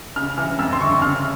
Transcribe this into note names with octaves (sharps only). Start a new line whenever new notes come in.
C#3 F6
E3 F6
F2 E6
C6
G1 C#6
C#3 F6